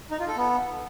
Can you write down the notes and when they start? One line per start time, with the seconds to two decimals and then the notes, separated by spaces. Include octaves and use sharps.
0.11 D#4
0.20 F4
0.28 A4
0.37 B3